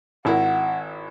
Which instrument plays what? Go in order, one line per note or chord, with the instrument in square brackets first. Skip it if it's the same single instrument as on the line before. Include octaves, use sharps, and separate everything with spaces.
[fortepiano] G#1 E4 A#4 [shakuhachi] F#5